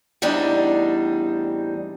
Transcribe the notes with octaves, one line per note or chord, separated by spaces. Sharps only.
E2 A2 G3 C4 D4 D#4